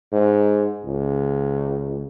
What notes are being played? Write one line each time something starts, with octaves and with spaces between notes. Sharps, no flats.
G#2
C#2